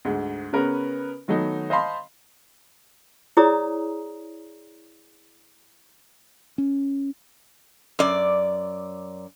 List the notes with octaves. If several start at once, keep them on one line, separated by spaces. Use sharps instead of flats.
D2 G#2
C#3 B3 C#4 A#4 B4
D#3 F#3 A3 B3 D#4
C5 D#5 F5 A5 B5 C6
E4 G#4 C#5 D5 A#5 D#6
C#4
F#2 D5